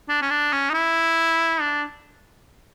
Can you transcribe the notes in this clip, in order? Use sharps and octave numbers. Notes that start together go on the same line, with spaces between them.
D4
C#4
D4
C#4
D#4
E4
D4